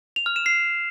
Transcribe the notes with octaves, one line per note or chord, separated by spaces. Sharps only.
F7
F6
E7
C7